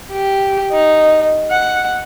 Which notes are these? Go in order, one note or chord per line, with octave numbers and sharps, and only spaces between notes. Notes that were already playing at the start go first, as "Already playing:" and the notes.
G4
D#4
F#5